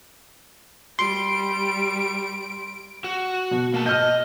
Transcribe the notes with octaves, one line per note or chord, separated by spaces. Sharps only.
G3 C6 D7
F#4
B2
A#3 A5
D#5 F6 G6